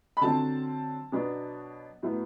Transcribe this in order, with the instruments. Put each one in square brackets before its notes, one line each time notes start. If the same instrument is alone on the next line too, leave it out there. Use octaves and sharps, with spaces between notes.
[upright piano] B5
D3 F#3 C4 A5
B2 F#3 B3 D4
A2 F#3 B3